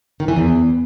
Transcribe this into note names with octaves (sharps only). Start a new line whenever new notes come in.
D#3
E3
E2